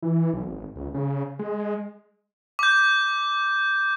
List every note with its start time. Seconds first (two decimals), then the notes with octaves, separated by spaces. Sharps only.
0.02 E3
0.33 B1
0.47 G#1
0.76 C#2
0.94 C#3
1.39 G#3
2.59 D6 G6